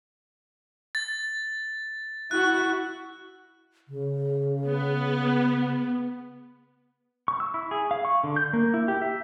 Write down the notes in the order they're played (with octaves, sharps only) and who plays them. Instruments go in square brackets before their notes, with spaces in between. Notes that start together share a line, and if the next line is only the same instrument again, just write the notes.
[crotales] A6
[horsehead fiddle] E4 F#4 [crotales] F#6
[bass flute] C#3
[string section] B3
[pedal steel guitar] C#6
E6
E4
G#4
F5
C#6
D3
G6
A#3
E4
G4
E5